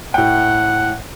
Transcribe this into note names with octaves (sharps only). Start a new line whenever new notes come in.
A2 F#5 G5